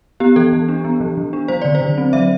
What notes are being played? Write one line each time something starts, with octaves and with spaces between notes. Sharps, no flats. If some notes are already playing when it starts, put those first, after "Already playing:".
B3 G4
E3 A4
E3
D4
B3
E3
E3
D4
F#3 C5
D3 D5
C5
D3
C4
F#3 E5